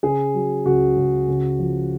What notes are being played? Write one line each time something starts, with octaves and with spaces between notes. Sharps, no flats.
C#3 G#4
F#3
C#2 F#4
C#2
C#3
F3